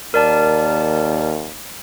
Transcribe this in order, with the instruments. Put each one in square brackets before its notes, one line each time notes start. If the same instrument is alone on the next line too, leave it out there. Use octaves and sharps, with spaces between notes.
[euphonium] D#2 [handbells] A#4 D5 A5